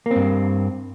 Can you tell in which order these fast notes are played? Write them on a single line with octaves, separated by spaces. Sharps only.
A#3 C4 G2